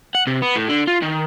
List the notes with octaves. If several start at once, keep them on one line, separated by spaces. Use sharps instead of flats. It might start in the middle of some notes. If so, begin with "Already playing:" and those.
F#5
C3
B3
A2
D3
F4
D#3